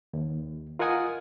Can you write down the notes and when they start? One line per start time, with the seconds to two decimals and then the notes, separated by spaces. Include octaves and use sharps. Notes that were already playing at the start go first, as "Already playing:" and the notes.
0.13 D#2
0.79 F4 A#4 D#5 F#5 G#5 D#6